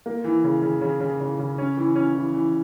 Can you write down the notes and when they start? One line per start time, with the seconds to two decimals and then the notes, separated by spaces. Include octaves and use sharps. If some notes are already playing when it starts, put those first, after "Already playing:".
0.06 A#3
0.24 E3
0.44 C#3
0.62 C#3
0.81 C#3
1.00 C#3
1.20 C#3
1.39 C#3
1.58 C#4
1.77 E3
1.95 C#4
2.15 E3
2.34 E3